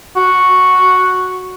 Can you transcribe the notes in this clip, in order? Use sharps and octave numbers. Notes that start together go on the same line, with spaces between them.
F#4